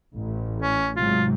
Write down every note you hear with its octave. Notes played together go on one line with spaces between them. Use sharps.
A1
C#4
G#2 C3 F#3 F4